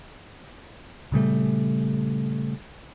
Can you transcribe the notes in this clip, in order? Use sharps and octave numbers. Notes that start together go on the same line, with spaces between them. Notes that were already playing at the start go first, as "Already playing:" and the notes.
A#2 C#3 G3 A3